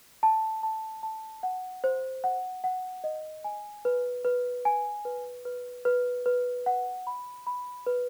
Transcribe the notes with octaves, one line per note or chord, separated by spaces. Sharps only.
A5
A5
A5
F#5
C5
F#5
F#5
D#5
G#5
B4
B4
G#5
B4
B4
B4
B4
F#5
B5
B5
B4